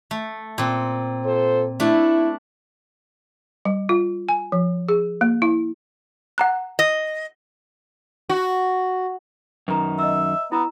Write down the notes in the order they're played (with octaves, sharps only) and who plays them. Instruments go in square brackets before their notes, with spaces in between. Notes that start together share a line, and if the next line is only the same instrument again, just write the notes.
[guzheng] A3
A#2 C4
[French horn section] F4 A4 C5
[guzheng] A3 D4 [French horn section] E4
[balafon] G3
F4
G#5
F3
G#4
A#3
E4
[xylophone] F#5 A#5 F#6
[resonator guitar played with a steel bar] D#5
[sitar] F#4
[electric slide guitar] F#2 D#3 [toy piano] B4 A#5
[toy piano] D#5 E6 [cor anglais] E5
[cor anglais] B3 [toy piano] E4 A#5 E6